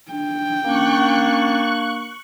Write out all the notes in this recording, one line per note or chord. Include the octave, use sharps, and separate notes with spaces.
D4 G5
A#3 C#4 D4 C#6 F#6